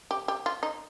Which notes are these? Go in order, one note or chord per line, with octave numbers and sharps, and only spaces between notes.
G4
G4
F4
D#4